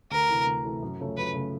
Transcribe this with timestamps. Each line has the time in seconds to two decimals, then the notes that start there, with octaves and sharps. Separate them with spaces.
0.11 D2 A#4
0.29 C3 E3 A3
0.46 D2
0.65 C3 E3 A3
0.82 F#2
1.00 C#3 F3 A3 C#4
1.17 F#2 B4
1.34 C#3 F3 A3 C#4